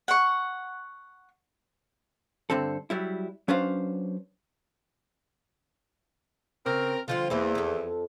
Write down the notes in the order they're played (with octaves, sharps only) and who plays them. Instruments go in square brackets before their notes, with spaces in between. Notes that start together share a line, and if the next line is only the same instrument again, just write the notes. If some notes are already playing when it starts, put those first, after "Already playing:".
[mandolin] F#5 C#6
[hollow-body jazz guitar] G2 D3 C4 A4
F#3 G3 E4
F#3 C#4 D4 B4 C5 F5
[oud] C#3 [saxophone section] C4 A#4
[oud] D3 F3 G3 [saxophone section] F4
[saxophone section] E2 [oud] G3 A#3 C4
[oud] F2 A4